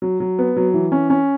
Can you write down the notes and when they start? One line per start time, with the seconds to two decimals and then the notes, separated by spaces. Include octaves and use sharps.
0.02 F#3
0.20 F#3
0.39 B3
0.57 F#3
0.74 E3
0.92 C#4
1.10 C#4